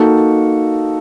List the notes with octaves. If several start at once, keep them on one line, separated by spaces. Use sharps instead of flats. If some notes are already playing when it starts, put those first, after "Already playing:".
Already playing: A#3 D#4 F#4 A4